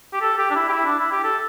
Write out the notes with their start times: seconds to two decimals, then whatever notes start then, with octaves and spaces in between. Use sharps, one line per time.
0.13 G4
0.21 A4
0.38 G4
0.50 D4
0.55 E4
0.69 G4
0.72 E4
0.85 D4
0.99 E4
1.11 G4
1.23 A4